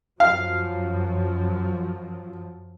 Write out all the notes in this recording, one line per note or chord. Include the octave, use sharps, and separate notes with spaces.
F#2 F3 F#3 F5